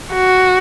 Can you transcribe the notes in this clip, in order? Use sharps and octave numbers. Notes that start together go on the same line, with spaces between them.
F#4